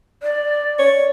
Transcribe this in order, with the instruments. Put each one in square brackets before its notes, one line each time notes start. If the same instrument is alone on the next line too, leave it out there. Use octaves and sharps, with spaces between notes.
[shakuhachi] D5
[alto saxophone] C#5